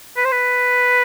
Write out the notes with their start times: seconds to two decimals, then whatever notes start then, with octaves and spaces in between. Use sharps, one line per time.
0.17 B4
0.25 C5
0.32 B4